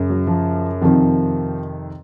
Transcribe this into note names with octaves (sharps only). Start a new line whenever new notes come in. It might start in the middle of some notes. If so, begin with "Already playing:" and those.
Already playing: F#2 C#3
F#3
F3
F2 C3 D#3 F3